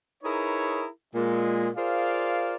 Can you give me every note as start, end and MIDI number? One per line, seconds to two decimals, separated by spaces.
0.23 0.86 63
0.23 0.86 64
0.23 0.86 68
0.23 0.86 70
0.23 0.86 71
0.23 0.86 73
1.14 1.69 46
1.14 1.69 56
1.76 2.56 65
1.76 2.56 68
1.76 2.56 70
1.76 2.56 72
1.76 2.56 74
1.76 2.56 77